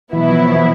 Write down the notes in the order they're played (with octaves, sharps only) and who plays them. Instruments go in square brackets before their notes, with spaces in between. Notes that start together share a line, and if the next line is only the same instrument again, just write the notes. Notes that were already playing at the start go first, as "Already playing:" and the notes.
[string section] B2 F#3 B3 E4 [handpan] E3
[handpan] F3
E3